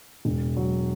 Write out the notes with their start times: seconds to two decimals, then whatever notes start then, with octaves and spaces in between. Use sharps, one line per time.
0.25 E1
0.57 F#3